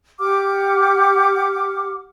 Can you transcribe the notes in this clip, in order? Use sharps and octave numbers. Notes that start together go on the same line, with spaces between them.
G4 F#5 D6 F6